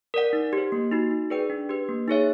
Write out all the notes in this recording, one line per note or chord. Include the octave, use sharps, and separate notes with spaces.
A#4 D5 F#5
D#4
G4 C5
A#3
D#4 F#4
D#4
G#4 B4 D5 G5
D4
G4 B4
A#3
D#4 G#4 C#5 E5